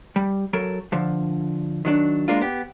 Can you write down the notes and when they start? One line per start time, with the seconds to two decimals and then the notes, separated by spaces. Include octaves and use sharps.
0.16 G3
0.53 F#3 A4 A#4
0.92 D3 F3
1.85 D#3 F#3 D4
2.28 G#3 A#3 D4 F4
2.41 B3 G4